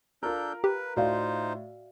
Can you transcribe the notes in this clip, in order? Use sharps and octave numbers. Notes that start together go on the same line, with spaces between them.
D4 F4 A4 A#4 G6
G4 B4
A2 D#4 F4 F#4 C5 D5 F5